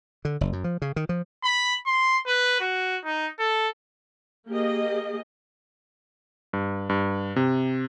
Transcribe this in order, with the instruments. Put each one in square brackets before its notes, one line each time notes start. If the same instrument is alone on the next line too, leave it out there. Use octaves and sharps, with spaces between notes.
[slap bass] D3
F#1
F#2
F3
C#3
D#3
F3
[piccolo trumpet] B5
C6
B4
F#4
D#4
A4
[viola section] A#3 G4 G#4 D#5
[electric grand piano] G2
G2
C3